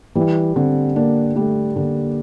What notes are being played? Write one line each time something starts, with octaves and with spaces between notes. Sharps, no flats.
E3 G3
D3 C4
A#3 D4
G3 A3
D3 A#3